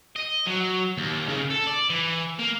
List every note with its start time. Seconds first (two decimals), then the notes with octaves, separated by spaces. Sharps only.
0.16 D#5
0.47 F#3
0.98 D#2
1.28 C#3
1.50 A4
1.67 D5
1.90 E3
2.39 A#3